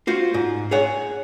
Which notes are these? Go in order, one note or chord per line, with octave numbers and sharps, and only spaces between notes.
F4 F#4 C5
G#2
G#4 C#5 F#5